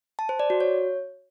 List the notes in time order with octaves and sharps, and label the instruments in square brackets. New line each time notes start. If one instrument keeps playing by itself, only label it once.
[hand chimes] A5
C5
D5
F#4
C#5